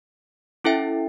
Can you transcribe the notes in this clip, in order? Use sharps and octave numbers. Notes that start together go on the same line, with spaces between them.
C#4 E4 A4 E5 G5